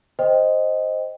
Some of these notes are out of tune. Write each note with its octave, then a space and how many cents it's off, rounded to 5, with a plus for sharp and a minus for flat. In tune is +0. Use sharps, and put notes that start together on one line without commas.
C5 +0 D#5 +0 G5 +0